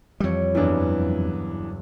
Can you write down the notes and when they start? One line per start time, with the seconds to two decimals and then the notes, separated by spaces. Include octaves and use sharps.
0.20 F2 E3 G3 C#5
0.55 F#1 E2 G2 E3 B3 D4